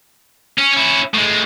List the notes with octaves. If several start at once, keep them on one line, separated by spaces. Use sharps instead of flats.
C#4
C#4 E4
A2 G#3